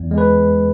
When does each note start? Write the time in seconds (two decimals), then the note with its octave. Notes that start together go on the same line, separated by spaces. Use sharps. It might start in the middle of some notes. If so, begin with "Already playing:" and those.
Already playing: E2
0.11 G#3
0.18 B4